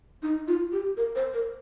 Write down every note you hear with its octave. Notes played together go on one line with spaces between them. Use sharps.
D#4
F4
G4
A#4
C5
A#4